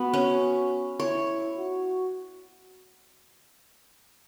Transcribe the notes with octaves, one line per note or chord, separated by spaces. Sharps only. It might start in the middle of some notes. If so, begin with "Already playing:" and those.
Already playing: B3 F#4
C#4
E4 C#5
F#4